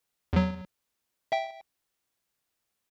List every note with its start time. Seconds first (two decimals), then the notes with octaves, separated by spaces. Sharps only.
0.33 E2 F#3
1.32 E5 G5